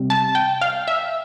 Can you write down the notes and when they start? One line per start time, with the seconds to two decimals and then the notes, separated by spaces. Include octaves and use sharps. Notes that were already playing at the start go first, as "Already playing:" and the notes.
Already playing: C3 G3
0.10 A5
0.35 G5
0.61 F5
0.88 E5